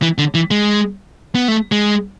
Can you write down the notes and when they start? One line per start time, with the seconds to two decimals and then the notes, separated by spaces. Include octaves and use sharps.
0.02 E3
0.18 D3
0.34 E3
0.51 G#3
1.35 B3
1.48 A3
1.72 G#3